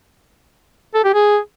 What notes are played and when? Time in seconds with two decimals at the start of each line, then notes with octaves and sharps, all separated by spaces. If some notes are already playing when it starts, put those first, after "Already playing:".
0.94 A4
1.04 G4
1.14 G#4